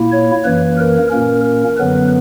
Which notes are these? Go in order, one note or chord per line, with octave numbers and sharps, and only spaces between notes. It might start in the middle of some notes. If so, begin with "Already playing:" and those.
Already playing: A#2 A#3 E4
C#5
F#2 E3 A#3 B4
A#4
A#2 A#3 C#4 A#4
A#4
F#2 D3 F#3 B3 B4